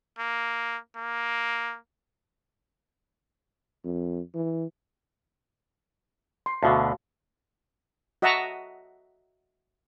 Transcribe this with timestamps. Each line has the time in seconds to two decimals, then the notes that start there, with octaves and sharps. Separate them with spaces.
0.19 A#3
0.96 A#3
3.84 F2
4.35 E3
6.46 C6
6.63 D2 B2 D3 F#4 F5 A5
8.22 F#4 D#5 E5 F#5 A5 A#5